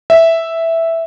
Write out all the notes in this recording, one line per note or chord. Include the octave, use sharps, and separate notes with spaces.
E5